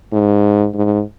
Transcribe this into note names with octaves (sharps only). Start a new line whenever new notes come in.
G#2
G#2